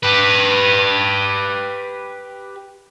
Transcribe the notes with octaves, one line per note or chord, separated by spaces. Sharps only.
G4 B4